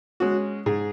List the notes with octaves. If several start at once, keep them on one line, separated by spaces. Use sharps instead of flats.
G#3 C#4 F#4
G#2 G#4